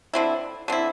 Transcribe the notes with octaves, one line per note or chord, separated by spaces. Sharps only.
D3 C4 E4
D3 C4 E4